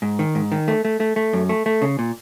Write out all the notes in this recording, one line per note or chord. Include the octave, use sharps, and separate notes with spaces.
G#2
D#3
G#2
D#3
A3
A3
A3
A3
F#2
A3
A3
C#3
A#2